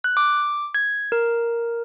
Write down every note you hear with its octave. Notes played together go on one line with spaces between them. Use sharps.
F#6
D6
G#6
A#4